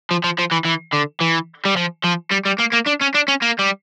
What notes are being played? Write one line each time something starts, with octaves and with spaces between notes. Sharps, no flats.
F3
F3
F3
E3
E3
D3
E3
G3
F3
F3
G3
G3
A#3
A#3
D4
C#4
D4
C#4
A#3
G3